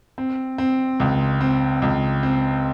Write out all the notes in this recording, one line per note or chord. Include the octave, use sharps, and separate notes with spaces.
C4
C4
C#2
C4
C#2
C4